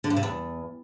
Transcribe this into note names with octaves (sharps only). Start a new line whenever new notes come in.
D3
G2
C3
E2